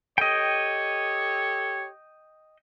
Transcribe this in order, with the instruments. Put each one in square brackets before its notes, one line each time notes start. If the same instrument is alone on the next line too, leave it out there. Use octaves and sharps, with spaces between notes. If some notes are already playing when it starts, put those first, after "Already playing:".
[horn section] G4 A4 C#5 [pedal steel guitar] D#5 G5